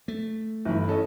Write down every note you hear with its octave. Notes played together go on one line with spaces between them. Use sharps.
A3
G1 E3
C#4 A4 D#5